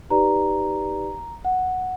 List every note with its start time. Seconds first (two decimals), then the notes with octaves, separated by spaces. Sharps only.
0.10 D#4 G4 B4 D5 A#5
1.45 F#5